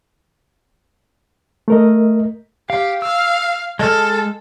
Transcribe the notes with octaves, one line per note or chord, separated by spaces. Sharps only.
A3 A#4 D#5
G4 F5
F5 E6
G#3 A4 D#5 F6